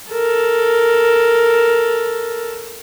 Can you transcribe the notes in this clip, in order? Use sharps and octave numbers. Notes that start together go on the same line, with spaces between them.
A4 A#4